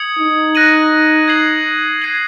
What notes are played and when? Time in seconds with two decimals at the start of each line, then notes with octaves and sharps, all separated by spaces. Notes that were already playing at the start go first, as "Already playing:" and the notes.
Already playing: D#6 G#6 C#7 F#7
0.18 D#4
0.55 F#6 A#6 D#7 F#7
1.28 G#6 C7 F#7
2.02 G#6 C7 D#7 F#7